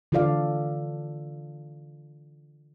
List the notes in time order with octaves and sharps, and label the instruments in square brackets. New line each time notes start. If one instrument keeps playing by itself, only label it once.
[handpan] D3 E3 F4 A4 D5 F5